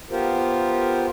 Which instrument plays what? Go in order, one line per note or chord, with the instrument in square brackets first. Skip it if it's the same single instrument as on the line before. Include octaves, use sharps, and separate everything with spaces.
[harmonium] B3 F4 G4 A#4 C5